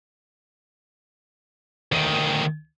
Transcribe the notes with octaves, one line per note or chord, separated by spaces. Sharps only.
D2 D#3